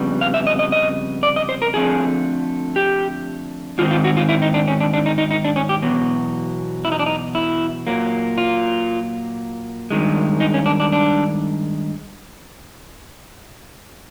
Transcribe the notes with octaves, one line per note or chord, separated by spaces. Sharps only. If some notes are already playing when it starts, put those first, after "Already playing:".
Already playing: F2 C#3 G3 B3
F5
E5
D#5
D#5
D#5
D5
D#5
C5
A#4
D3 F3 A3 C4 G#4
G4
G#2 D#3 C4 F4
F4
F#4
F4
E4
D#4
D4
C#4
D4
D4
D#4
D#4
D#4
D4
C#4
G4
E2 B2 F#3
E4
D#4
D4
D#4
E4
A#2 F#3 A#3
F4
G2 D#3 G#3
D#4
C#4
D4
D4
D4